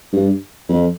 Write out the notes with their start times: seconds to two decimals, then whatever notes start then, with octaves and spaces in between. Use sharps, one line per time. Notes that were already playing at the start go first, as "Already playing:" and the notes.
0.13 G2
0.69 F2